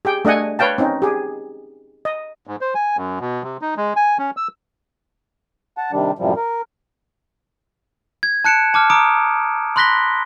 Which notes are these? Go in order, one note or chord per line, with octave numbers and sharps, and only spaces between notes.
G4 G#4 G5
A3 D4 D#5 F#5 G#5
B4 C#5 F5 G5 A5
C4 C#4 D#4
G4 G#4
D#5
G#2
C5
G#5
F#2
B2
C3
D#4
G#3
G#5
C#4
E6
F#5 A5
C3 D#3 G3 D4
F#2 A2 C3 F3 G3
A#4
G#6
A5 F#6 C#7 D7 E7
A5 D6 F6
A#5 D6 D#6 D7
B5 C6 F#6 A#6 B6 G7